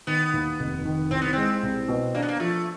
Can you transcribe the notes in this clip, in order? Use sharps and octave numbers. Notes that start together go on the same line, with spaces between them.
D#3 B3
D#2
F1
D#3
C2 C4
B3
G#3 C4
C2
B2
A#3 D4
B3
A#3
F3 A3